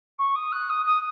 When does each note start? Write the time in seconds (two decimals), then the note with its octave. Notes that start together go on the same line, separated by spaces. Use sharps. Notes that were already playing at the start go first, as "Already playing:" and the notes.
0.19 C#6
0.35 D#6
0.52 F#6
0.69 D#6
0.86 D#6